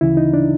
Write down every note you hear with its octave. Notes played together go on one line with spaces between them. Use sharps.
D2 C#3 E3 E4
D#4
D4